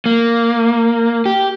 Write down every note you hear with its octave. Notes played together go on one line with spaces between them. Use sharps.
A#3
G4